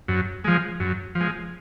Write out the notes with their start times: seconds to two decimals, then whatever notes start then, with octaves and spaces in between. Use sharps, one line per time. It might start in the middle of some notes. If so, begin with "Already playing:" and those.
0.08 F#2
0.44 F3 G#3
0.80 F#2
1.15 F3
1.21 G#3